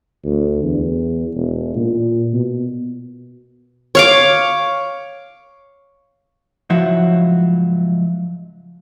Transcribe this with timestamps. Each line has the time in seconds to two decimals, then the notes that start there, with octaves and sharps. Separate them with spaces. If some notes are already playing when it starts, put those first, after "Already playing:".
0.24 D2
0.64 E2
1.34 E1
1.76 A#2
2.33 B2
3.95 C#5 F5 D6
6.70 C#2 G#2 F3 F#3 E4 F#4